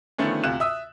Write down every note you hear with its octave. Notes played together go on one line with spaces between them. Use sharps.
D3 D#3 F3 A3 B3 C#4
D2 C3 F4 F#6 E7
E5 D#6 E6